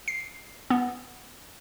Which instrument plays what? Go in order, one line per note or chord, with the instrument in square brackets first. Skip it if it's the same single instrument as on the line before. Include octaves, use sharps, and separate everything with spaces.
[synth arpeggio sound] C7
B3